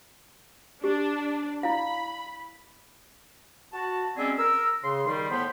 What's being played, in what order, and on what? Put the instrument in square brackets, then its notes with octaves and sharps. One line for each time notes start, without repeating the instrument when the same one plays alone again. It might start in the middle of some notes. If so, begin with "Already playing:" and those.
[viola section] D4 [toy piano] G4
[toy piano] E4 D5 F5 [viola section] B5
[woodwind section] F#4 A5
G#3 C4 C#4 E4 G#4 D5
A#4 E6
C#3 C6
D#3 G3 C6
A2 B3 C5 G5 B5 C6